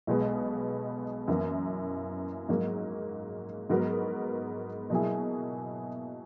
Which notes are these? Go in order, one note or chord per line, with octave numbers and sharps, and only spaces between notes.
B1 B2 G#3 B3
F#2 E3 A#3 E4
G#2 F#3 A#3
G#2 F#3 B3 F#4 A#4
B2 F#3 A#3 E4 G#4